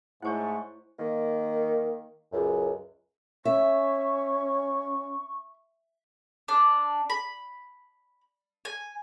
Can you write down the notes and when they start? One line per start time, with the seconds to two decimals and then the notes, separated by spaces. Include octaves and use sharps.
0.22 G#2 A3 E4 C5 C#5 F#5 C#6
0.99 D#3 A#3
2.33 C#2 F#2
3.45 C#4 E5 C#6
6.48 D4
7.10 B5
8.65 G#5